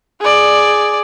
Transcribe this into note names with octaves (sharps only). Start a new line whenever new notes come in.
G#4 D5